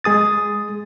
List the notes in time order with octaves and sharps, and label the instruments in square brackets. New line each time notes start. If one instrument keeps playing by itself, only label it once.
[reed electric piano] G#3 G#4 D#6 A6